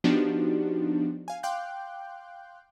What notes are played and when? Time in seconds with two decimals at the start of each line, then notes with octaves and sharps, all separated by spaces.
0.04 F3 B3 D4 D#4 F#4 G4
1.28 F5 G#5
1.43 F5 G5 C6 D6 F#6 G6